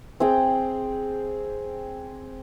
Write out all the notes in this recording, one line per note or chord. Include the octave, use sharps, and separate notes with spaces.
C4 G#4 G5